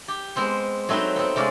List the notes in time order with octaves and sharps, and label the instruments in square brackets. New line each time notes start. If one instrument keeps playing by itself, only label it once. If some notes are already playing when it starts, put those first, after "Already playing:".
[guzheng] G4
G#3 B3 C4 C5
F#3 A3 C4 D#4 B4
B3 C4
C3 G#3 C#4 D5 F5